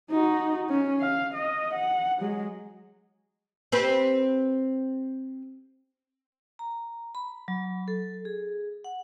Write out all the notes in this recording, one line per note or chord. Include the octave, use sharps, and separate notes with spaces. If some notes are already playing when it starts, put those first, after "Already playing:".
D#4 F#4
C#4
F5
D#5
F#5
F#3 G#3
C4 G4 B4
A#5
B5
F#3
A4
G#4
F#5